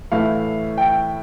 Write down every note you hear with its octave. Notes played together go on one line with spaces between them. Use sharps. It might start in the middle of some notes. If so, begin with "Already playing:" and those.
A2 E3 A3 E4 F5
G5